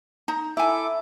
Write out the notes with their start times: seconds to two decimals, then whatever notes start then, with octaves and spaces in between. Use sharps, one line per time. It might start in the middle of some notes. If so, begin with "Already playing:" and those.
0.28 D#4 A#5
0.57 E4 A4 E5 G#5 D6